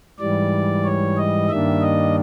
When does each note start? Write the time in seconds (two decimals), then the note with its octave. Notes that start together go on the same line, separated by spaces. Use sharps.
0.19 G#2 E3 G3 D5
0.84 C#5
1.18 D#5
1.49 G2 D#3 G3 A#3 D4 E5
1.82 D#5